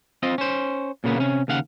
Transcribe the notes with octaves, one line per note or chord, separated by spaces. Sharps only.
C4 F4 D#5
C#4 C5
A#2 C#3 A#3 B3
C3 C#4
D#2 C#3 F5 F#5